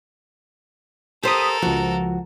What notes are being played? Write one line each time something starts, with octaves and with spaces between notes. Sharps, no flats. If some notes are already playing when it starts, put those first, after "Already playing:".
G4 A4 A#4 C5 D#6 B6
C#2 F3 F#4